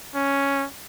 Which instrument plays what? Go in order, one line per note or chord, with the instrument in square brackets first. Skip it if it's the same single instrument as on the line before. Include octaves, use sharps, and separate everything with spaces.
[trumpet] C#4